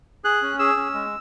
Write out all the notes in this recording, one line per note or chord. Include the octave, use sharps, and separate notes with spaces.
G#4 F#6
C#4
G#4 E6
C#4
G#3